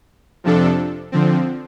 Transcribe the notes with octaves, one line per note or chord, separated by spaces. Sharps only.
F2 C3 F3 D4 A4
D3 F3 C4